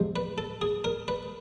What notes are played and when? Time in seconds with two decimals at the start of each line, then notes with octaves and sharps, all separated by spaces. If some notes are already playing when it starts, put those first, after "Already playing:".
Already playing: E2 C3 F3 G#3
0.16 B4
0.38 A4
0.62 G#4
0.84 A#4
1.08 B4